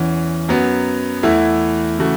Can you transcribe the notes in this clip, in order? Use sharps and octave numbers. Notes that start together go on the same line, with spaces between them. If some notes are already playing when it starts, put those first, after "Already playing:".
Already playing: E2 E3 C#4
F#2 F#3 B3
E2 E3 A3 E4
C#3 E3 A3 F#4